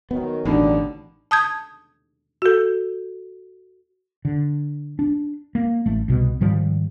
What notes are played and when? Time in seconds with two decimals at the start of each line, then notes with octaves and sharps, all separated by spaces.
0.11 D#3 F#3 B3
0.45 A1 B2 D3 D#3 F#3 G3 D5
1.31 A5 D#6 G6 G#6
2.42 F#4 A4
4.25 D3
4.99 D4
5.55 A#3
5.86 A1 A3
6.08 C2 B2
6.41 G#2 D#3 F3 G3